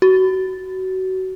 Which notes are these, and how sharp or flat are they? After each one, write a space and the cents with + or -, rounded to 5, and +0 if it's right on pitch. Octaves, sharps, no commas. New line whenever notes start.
F#4 +25